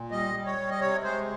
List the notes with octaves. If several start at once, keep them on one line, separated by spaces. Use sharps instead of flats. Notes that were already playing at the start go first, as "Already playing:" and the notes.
Already playing: A#2
G3 D#5
G3
C#5
G3
D#5
C3 C#5
G#3 C5